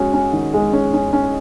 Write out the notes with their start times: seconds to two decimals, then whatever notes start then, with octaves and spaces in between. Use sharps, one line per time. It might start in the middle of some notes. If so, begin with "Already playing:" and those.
Already playing: G#3 C#4 F#4
0.14 C#4
0.33 D#3
0.54 G#3
0.73 C#4
0.94 C#4
1.13 C#4